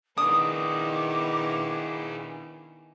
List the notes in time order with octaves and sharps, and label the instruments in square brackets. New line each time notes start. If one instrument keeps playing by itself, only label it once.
[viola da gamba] D#3 B3 E4 [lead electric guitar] D4 G#4 [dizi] D6 [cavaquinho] D#6